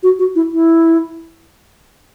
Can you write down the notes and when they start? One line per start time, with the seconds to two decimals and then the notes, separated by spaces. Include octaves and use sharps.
0.03 F#4
0.19 F#4
0.35 E4
0.52 E4